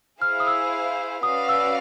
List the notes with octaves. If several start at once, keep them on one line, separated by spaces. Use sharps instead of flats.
E4 G#4 C5 F5 F6
D#6
E6
C#4 F#4 B4 D5 F5 D#6
E6